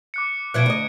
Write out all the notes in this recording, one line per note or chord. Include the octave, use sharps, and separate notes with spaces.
D6 F#6 C#7
B2 F3 E4 F#6 G#6 D7
D2 D#5